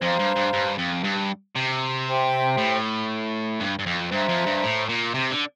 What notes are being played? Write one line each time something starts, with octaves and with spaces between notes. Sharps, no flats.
F2 C5 F5 A#5
G2
G2
G2
F2
G2
C3
G4 C5 E5 G5
A2
G2
G2
F2
G2 C5 E5 A#5
F2
G2
A2
A#2
C3
D3